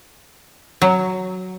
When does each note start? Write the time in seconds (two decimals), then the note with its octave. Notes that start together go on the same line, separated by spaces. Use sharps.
0.82 F#3